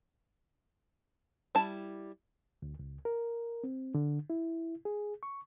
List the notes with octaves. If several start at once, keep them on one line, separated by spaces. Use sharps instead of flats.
G3 E4 A5
D2
C#2
A#4
C4
D3
E4
G#4
C#6